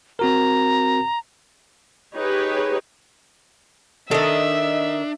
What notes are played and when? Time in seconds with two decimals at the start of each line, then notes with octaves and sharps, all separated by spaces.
0.19 C4 F#4 A#4 A#5
2.15 D#4 G4 G#4 B4 C#5
4.11 D#3 D4 A4 D#5 E5